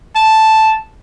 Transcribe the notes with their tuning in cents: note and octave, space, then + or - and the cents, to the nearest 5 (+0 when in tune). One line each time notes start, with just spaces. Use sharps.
A5 -5